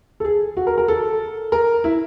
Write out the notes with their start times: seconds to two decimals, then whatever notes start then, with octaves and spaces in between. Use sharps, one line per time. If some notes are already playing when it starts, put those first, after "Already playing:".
0.20 A4
0.25 G#4
0.57 F#4
0.67 A#4
0.78 A#4
0.88 A4
1.52 A#4
1.84 E4